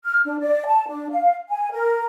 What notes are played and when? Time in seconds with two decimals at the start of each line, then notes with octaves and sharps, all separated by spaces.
0.05 F6
0.25 D4
0.40 D5
0.66 A5
0.88 D4
1.10 F5
1.49 G#5
1.71 A#4